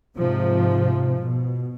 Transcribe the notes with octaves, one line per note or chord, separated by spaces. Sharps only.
G#2 C3 F3
B2